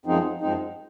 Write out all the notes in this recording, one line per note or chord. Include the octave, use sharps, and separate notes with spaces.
F#2 F3 G#3 C4 D#4
F#2 F3 G#3 C4 D#4